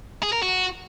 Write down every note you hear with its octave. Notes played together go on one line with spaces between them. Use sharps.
G#4
A#4
F#4